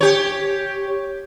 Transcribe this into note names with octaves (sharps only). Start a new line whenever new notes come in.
G4 C#5